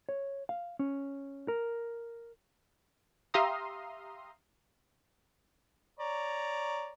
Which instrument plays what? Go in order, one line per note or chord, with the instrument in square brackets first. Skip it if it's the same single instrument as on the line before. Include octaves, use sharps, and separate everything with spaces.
[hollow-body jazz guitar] C#5
F5
C#4
A#4
[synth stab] G4 E5 F5 A#5 C6 D#6
[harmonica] C#5 D5 A#5